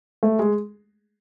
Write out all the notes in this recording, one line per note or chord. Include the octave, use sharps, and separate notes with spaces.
A3
G#3